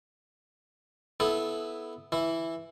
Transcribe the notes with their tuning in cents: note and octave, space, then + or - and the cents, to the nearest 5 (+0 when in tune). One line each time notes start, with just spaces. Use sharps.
B3 +0 E4 +0 A4 -20
E3 +0 E4 +0